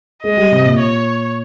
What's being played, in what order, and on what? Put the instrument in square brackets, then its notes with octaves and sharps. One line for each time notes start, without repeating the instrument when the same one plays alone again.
[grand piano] G#3 [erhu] D#5
[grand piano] G3
C3
A#2
[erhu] C#5